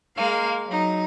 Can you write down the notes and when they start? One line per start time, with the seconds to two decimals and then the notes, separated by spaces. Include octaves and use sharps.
0.16 G#3 A#3 F5
0.66 F#3 D#4